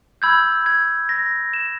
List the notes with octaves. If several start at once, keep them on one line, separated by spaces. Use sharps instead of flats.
B5 E6 G6 G#6
G#6
A#6
E7